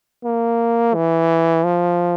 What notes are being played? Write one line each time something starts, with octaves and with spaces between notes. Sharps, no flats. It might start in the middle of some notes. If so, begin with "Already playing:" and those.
A#3
E3
F3